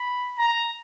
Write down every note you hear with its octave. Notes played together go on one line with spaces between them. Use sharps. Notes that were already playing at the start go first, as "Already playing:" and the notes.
Already playing: B5
A#5